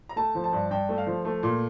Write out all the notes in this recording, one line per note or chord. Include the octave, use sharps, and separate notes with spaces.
A#5
A3 A5
F3
A5
G2
G2 G5
A3
F5
F3
A3
A#2